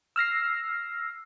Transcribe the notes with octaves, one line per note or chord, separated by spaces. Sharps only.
E6 F6 A#6 C7